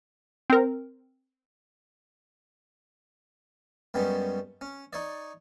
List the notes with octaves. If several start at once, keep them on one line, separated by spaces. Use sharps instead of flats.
C4 A#4
F#2 G3 G#3 B3 C#4
C#4
D#4 C#5 D5